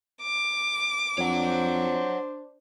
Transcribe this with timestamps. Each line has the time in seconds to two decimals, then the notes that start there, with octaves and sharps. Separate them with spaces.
0.22 D6
1.18 F2 D4 C5 C#5 F#5